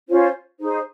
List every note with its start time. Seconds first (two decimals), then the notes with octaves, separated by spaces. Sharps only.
0.08 C#4 F4 C5
0.59 D#4 G#4 C5